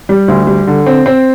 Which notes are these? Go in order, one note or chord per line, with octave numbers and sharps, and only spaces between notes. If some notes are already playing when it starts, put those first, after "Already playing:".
G3
D2
G3
D3
C4
C4